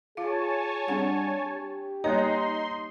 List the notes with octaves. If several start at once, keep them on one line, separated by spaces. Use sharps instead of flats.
F4 G#4 C#5 F5 G#5 A5
G3 C4 D4 F#5
G4
G3 A#3 D#4 C#5 C6